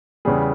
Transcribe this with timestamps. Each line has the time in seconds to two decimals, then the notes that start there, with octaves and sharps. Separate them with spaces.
0.25 E2 C#3 G3 G#4